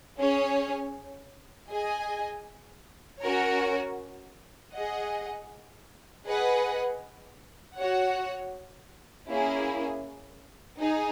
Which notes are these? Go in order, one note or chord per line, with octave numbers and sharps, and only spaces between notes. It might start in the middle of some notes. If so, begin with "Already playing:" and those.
C#4 G#4 C#5 G#5
G#4 D#5 G#5
C#4 F#4 A#4 C#5
G#4 D#5 F#5
G#4 B4 D#5 F#5
F#4 C#5 F#5
A#3 C#4 E4 G#4
D#4 G#4